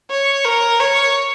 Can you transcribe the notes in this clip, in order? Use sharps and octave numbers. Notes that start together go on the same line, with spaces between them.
C#5
A#4
C#5